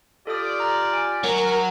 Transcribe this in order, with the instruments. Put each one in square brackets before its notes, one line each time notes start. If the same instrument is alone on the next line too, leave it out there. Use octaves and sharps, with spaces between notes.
[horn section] F4 G4 D5 [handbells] A4 D#6
[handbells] A#5 F6 F#6
G#5
[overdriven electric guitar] F#3 [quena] A#4